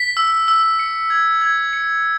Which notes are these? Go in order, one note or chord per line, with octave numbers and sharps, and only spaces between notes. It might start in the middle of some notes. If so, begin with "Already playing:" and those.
Already playing: B6
E6
E6
C#7
G#6
G#6
C#7